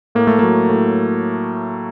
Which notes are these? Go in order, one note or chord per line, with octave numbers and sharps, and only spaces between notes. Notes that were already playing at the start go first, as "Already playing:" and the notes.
A2 A#3
A3
F#3 A#3
A2